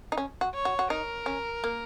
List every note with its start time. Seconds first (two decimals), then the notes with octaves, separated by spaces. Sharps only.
0.12 D#4
0.17 C#4
0.41 F#4
0.54 C#5
0.65 F#4
0.79 F#4
0.90 D#4 A#4
1.26 C#4
1.64 A#3